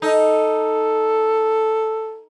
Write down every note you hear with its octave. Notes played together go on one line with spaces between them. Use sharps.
D#4 A4